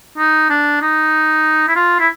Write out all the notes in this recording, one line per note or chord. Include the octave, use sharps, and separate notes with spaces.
D#4
D4
D#4
E4
F4
E4